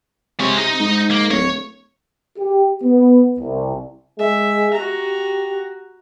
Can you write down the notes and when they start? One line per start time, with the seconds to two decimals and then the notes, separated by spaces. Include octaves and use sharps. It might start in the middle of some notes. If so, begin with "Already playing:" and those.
0.40 C3 G#3 C#5
0.58 D#4 D#5
0.80 G#2
1.11 A#3
1.31 D1 C#5
2.38 G4
2.84 B3
3.39 C2
4.19 G#3 E5
4.74 F#4 G4 A#5